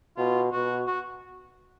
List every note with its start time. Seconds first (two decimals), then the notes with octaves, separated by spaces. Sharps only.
0.17 B2 F4
0.52 B2 F#4
0.87 F#4